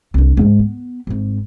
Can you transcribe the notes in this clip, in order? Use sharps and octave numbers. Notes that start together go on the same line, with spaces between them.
C2 D4
D#1 G#2
B3
G#1 G#2